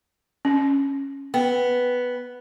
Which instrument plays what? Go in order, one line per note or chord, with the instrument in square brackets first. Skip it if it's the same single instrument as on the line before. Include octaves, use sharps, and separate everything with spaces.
[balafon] C#4
[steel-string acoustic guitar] B3 [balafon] G5